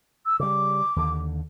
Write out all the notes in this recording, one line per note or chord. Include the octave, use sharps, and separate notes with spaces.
E6
C#3 G3 D6
D#2 D3